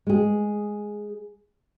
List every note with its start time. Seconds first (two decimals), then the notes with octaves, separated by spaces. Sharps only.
0.07 G#3 G#4